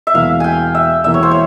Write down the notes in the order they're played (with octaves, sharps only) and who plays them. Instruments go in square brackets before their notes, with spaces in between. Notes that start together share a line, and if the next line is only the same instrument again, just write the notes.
[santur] E5
[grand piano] E1 E2 E3 A#3 [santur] F5
[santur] G5 G#5
E5
[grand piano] E1 E2 E3 A#3 [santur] E5
[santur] C#5
C5
C#5